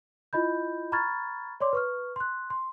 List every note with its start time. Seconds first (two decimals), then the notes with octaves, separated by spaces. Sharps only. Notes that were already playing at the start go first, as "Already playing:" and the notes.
0.33 E4 F4 D#5 B5 G6
0.92 A#5 B5 C#6 F6 G#6 A6
1.60 C#5 D5 C6 D6
1.73 B4 C#6 F6
2.16 C6 F#6
2.50 C6